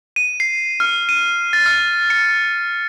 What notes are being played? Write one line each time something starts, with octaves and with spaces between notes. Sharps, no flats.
D#7
C7
F6
D#7
A6
F6
C#7